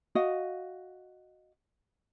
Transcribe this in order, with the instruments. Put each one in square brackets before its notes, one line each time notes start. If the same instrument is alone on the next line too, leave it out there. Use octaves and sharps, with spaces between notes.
[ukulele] F#4 D#5 F5